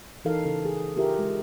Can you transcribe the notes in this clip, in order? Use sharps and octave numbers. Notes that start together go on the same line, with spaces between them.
E3 D#4 A4 A#4 F5
C#3 A4
G#4
E4 F4 G4 A#4 E5
G#3